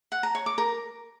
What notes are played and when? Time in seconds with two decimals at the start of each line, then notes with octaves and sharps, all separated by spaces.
0.12 F#5
0.23 A#5
0.35 C#5
0.46 D6
0.58 A#4